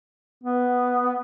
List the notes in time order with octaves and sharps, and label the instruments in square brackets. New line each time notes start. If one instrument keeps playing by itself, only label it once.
[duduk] B3